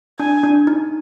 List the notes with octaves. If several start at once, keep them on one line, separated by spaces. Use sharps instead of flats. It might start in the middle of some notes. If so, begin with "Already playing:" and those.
D4 G#5
D4
D#4